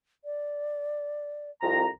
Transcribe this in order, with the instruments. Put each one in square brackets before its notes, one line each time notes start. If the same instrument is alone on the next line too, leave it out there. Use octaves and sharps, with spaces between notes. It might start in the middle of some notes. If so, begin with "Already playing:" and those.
[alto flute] D5
[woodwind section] C2 F2 A#5